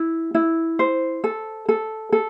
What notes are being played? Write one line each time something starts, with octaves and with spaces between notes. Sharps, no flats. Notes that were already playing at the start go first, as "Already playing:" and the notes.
Already playing: E4
E4
C5
A4
A4
A4